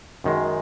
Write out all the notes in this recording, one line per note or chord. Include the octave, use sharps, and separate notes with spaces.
F#2 D#3 G#3